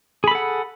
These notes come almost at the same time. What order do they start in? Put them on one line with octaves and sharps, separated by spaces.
G#4 B5 A4 F#5